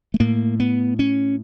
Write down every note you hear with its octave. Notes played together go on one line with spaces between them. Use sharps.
A3
A2 A#3
B3
C#4